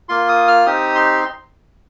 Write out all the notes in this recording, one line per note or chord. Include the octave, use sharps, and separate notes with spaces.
A#3 F4 C6
D#6
F6
C4 D#4 G4 D#6
C6